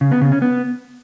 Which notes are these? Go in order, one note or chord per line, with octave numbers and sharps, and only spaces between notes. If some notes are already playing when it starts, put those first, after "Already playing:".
C#3
B3
C#3
C#4
B3